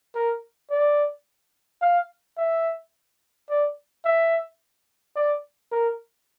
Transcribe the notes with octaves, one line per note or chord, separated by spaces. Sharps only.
A#4
D5
F5
E5
D5
E5
D5
A#4